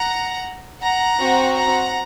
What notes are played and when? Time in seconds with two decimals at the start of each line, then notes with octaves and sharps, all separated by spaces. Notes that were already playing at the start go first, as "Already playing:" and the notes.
Already playing: F#5 A#5
0.82 F#5 A#5
1.19 C4 F#4
1.56 F#5 A#5